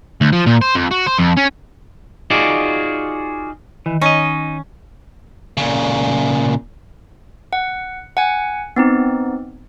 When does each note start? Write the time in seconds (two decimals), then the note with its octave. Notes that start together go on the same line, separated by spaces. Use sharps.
0.21 D2
0.33 F3
0.46 A#2
0.62 C5
0.75 F2
0.91 F#4
1.07 C5
1.18 F2
1.37 C#4
2.30 D#4 F4 F#4 G#4 D5
3.86 D#3 E3
4.01 C#4 D#4 D#5
5.57 A#2 C#3
7.53 F#5
8.17 F#5 G#5
8.76 B3 C4 D#4